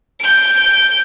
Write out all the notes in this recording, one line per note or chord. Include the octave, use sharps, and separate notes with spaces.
G6 D7